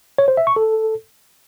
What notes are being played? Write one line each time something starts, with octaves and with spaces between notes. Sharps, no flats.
C#5
C5
E5
C#6
A4